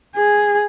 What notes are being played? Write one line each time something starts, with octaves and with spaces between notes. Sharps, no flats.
G#4